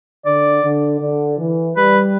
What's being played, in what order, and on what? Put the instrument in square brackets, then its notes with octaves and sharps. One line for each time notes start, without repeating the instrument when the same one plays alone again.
[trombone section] D3 [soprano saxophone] D5
[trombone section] D3
D3
E3
[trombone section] G3 [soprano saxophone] B4